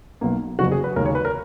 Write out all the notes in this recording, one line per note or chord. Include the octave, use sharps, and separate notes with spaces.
B1 B2 A#3
F#1 E2 C#3 F#4
G#4
B4
D#2 C#3 G#3 C#4 A#4
C#5
B4
A#4